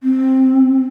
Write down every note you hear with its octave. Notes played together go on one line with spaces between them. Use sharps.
C4